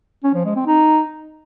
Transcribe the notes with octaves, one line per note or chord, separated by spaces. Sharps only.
C#4
F3
G#3
C4
D#4